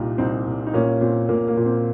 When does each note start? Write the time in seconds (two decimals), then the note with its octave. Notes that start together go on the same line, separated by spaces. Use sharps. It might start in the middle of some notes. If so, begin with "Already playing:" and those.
Already playing: C2 A#2 D#4 G4
0.18 C2 C4 D#4
0.46 C2
0.67 D#4
0.73 A#2 A#3 C#4
1.01 A#2 C4
1.29 A#2 A#3
1.48 A#3
1.57 A#2
1.66 C4